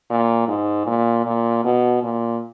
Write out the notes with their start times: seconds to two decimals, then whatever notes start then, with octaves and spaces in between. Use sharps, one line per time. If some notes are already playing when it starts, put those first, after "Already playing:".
0.10 A#2
0.48 G#2
0.87 A#2
1.26 A#2
1.65 B2
2.03 A#2